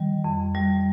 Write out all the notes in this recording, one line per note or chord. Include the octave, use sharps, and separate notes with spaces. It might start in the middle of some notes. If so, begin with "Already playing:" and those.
Already playing: D#3 G3
F2
G3